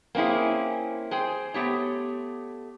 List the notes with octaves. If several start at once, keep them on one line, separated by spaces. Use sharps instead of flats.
A#3 C4 C#4 E4 G#4
G#4 C5 G5
A3 B3 G4 C#5